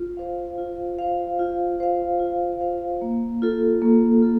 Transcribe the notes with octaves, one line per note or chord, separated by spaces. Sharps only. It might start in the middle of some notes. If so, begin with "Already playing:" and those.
Already playing: F4
C5 F5
F4
C5 F5
F4
C5 F5
F4
C5 F5
A#3
F4 A4
A#3
F4 A4